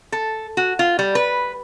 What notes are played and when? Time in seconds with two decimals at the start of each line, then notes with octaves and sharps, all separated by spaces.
0.12 A4
0.57 F#4
0.79 F4
0.99 G3
1.15 B4